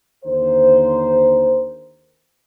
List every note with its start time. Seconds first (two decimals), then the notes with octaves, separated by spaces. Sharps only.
0.25 D#2 D3 A#4 C5